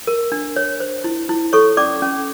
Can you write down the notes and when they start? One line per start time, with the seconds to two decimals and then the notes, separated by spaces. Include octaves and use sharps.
0.07 A#4
0.32 D4
0.56 C#5
0.80 C5
1.04 E4
1.29 E4
1.53 A4 C#5 C#6
1.77 C#4 D5 D6
2.02 C#4